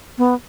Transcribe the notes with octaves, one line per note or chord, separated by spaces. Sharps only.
B3